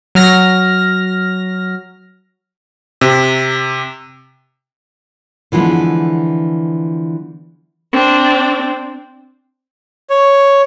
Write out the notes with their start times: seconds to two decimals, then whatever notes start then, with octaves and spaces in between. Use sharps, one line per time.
0.15 F#3 F6 A#6
3.01 C3
5.52 D3 E3 F3 G#3 B3
7.93 C4 D4
10.10 C#5